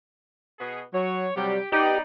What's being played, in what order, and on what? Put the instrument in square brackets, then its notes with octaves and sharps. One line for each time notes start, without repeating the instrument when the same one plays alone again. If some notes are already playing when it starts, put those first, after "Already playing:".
[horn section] B2 B3 G#4
[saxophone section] F#3 [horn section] C#5
[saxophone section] C3 F#3 G3 [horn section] G4
[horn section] B3 D5 [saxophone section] D#4 [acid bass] G4